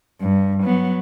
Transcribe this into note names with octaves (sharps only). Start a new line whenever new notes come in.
G2
F#3 B3